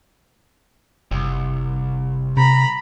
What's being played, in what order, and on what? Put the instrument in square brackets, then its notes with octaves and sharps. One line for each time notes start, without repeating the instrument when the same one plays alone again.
[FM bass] F#1 [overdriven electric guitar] C2
[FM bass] C3 [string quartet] A#5 B5